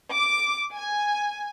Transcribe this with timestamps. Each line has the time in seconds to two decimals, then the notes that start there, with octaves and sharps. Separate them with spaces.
0.12 D6
0.74 G#5